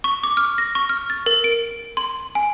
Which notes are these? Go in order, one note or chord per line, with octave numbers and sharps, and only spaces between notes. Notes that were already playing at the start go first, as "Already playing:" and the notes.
C#6
D6
F6
A#6
C#6
F6
A6
A#4
D7
C6
G#5